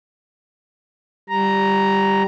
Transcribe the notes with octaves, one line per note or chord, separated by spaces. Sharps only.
G3 A#5